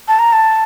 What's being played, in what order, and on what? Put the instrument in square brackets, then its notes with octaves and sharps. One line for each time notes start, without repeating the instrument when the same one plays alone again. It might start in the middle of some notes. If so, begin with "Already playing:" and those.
[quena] A5
A#5
A5